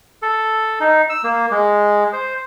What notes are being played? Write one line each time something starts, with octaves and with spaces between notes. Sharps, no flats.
A4
D#4
E6
A#3
G#3
C5